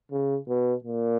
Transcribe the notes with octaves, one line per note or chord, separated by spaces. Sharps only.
C#3
B2
A#2